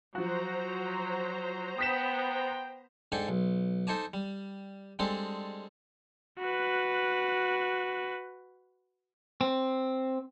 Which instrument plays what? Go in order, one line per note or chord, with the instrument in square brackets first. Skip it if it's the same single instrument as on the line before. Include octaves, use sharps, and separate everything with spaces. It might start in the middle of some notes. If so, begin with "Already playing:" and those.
[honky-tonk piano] F3 F#4 [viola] F#3 [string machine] C5 A#5
[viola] B3 [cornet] G5 [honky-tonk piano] D#6 B6 E7
[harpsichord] G#2 D4 A4 G5 G#5
B1
D#4 A4 C5 G#5 A5 D6
G3
G3 G#3 C4 D4 G#4 A4
[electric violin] F#4 B4
[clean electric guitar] C4